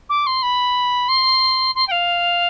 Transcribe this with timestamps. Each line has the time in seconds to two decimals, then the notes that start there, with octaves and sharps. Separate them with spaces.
0.09 D6
0.27 C6
0.43 B5
1.09 C6
1.75 C6
1.87 G5
1.91 F5